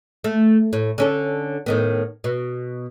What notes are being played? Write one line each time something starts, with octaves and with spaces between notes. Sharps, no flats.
A3
A2
D3 C#4 A4
A2 D#3 B3
B2